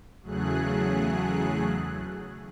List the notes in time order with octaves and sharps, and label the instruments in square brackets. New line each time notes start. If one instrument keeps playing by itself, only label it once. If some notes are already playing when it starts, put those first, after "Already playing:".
[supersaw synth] E2 C#3 F#3 A3 G#4 F#6